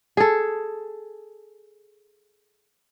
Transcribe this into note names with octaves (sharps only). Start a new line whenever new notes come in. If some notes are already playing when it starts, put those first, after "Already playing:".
G#4 A4